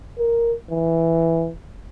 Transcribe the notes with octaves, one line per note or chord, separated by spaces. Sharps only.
A#4
E3